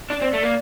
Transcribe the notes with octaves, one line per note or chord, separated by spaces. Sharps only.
D4 D5
C4
A3
A#3